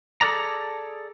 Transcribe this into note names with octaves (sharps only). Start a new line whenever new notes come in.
G#4 A4 B4 D5 A#5